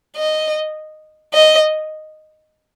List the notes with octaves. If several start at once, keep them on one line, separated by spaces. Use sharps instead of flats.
D#5
D#5